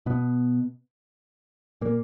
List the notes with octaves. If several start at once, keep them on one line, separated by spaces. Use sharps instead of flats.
B2 B3
A#2 A#3